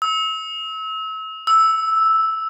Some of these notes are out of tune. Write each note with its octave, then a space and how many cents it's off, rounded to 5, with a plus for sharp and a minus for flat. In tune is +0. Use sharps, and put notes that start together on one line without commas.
E6 -35
E6 -5